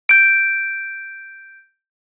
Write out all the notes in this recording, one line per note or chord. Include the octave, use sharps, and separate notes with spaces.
G6 D7